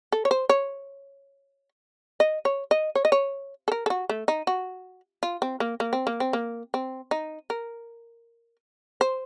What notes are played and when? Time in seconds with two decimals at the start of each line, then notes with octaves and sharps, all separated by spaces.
0.12 A4
0.25 C#5
0.31 C5
0.49 C#5
2.20 D#5
2.45 C#5
2.71 D#5
2.95 C#5
3.05 D#5
3.12 C#5
3.68 A4
3.72 A#4
3.86 A4
3.90 F#4
4.09 A3
4.28 D#4
4.47 F#4
5.23 F4
5.42 C4
5.60 A#3
5.80 A#3
5.93 C4
6.07 A#3
6.20 C4
6.33 A#3
6.74 C4
7.11 D#4
7.50 A#4
9.01 C5